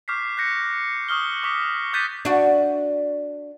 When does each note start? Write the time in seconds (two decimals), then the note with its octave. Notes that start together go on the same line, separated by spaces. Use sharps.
0.08 C#6 D6 F6 G6 B6 C7
0.37 F#6 G6 A#6 C#7
1.09 C#6 D#6 F6 G7
1.43 C#6 D6 B6 C#7
1.93 D6 F#6 G6 A6 B6 D#7
2.25 D4 F#4